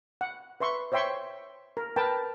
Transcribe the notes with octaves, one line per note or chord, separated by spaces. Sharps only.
F#5
B4 E5 C6 C#6
C5 C#5 E5 G5 C6 C#6
A#4
A#4 B4 G5 A5